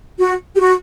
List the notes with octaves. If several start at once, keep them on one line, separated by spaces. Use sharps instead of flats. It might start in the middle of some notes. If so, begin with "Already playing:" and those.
F#4
G4
F#4